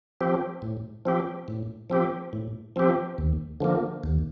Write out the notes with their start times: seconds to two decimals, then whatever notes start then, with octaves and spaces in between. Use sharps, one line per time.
0.21 F3 C4 G4
0.62 A2
1.05 F3 C4 G4
1.48 A2
1.90 F3 C4 G4
2.33 A2
2.76 F3 C4 G4
3.18 D#2
3.60 D3 F3 A#3
4.04 D#2